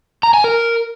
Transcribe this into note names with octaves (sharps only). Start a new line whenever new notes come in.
A#5
G#5
A#4